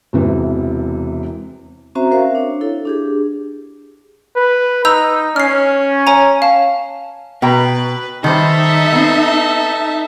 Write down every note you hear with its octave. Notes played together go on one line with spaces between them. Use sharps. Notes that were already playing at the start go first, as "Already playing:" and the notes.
E1 C3 E3
C4 C#4 F#4 C5 E5 A#5
F#4 A#4 C5 E5 F5
D4 C#5
E4 A4
D4 G4 G#4
B4
D#4 A#5 E6 G6
C#4 F6 C7
C#5 G#5 A#5
F5 A5
B2 B4 G5 A#5
D#3 G3 D#4 A4 C5 E5
B3 C4